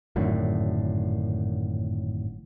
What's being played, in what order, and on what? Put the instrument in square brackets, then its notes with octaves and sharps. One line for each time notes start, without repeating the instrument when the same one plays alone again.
[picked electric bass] G#1 F#2 A2 D3